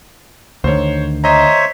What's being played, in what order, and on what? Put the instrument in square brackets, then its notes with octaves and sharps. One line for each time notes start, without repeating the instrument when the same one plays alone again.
[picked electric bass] D2 D#3 [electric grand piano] C5 C#5
[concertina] C5 C#5 E5 [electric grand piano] D#5 A#5